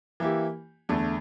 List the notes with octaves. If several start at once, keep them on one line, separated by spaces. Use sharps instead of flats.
E3 A#3 E4 G4
E2 D3 A3